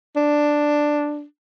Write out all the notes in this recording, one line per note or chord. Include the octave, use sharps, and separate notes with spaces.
D4